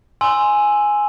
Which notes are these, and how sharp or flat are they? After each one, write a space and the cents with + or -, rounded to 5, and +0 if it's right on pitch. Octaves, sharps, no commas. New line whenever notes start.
G#5 +0 C6 +0 E6 +0